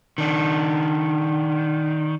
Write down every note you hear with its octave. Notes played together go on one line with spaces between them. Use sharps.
D#3 D4